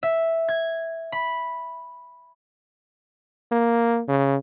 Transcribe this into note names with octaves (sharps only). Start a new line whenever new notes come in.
E5
G#6
B5
A#3
C#3